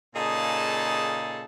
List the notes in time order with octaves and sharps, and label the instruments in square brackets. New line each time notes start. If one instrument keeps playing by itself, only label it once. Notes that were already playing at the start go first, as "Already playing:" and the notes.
[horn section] A#2 C#3 D#4 G#4 A4 A5